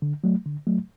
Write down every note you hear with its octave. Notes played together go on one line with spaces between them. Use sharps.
D3
F#3 A3
D3
F#3 A3